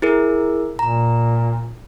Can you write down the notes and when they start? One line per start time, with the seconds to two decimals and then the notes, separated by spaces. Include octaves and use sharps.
0.02 E4 G#4 A#4
0.79 A#2 A#5